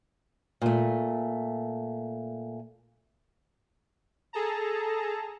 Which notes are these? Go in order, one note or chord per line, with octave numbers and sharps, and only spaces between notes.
A#2 A3
G#4 A4 A5 A#5